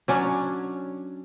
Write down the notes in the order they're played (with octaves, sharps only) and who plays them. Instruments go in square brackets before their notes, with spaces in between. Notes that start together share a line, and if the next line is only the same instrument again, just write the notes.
[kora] F#3 C#4 D4